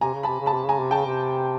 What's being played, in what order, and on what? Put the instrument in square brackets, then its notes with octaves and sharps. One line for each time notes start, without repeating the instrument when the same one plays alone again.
[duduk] C3 [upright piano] G#5 A#5
[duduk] C#3
[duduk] C3 [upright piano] A5 B5
[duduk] C#3
[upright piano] A5 B5
[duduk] C3
[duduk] C#3 [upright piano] G#5 A#5
[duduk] C3
[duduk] C#3 [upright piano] G5 A5
[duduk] C3